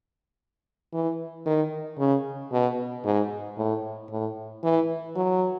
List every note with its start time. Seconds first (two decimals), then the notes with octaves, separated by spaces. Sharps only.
0.94 E3
1.46 D#3
1.99 C#3
2.52 B2
3.05 G#2
3.58 A2
4.11 A2
4.64 E3
5.16 F#3